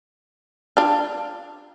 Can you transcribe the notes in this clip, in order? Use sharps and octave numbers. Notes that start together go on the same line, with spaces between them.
D4 F4